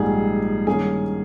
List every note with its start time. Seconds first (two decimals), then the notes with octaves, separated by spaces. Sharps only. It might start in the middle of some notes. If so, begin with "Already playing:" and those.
Already playing: A#1 G#2 G3 G#4
0.67 G2 D#3 A#3 C#4 G#4 G#5